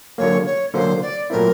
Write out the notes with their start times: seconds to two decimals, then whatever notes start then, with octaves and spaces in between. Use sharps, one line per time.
0.18 D3 F#3 A#3 C#5
0.46 C#5
0.74 D3 F#3 A#3 C5
1.02 D5
1.30 A#2 F#3 A3 C4 E4 A#4